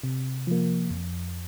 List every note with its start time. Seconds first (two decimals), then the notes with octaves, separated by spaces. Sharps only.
0.03 C3
0.47 F3 A#3
0.91 F2